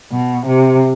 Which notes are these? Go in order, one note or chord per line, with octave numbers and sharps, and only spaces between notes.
B2
C3